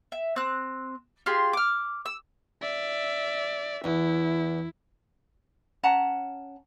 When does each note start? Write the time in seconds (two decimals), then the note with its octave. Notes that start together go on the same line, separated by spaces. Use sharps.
0.12 E5
0.36 C4 F#6
1.26 F4 G4 G#4 C6
1.53 D6 F6
2.06 E6
2.62 D5 E5
3.84 E2 E4
5.83 C#4 F#5 A5 A#5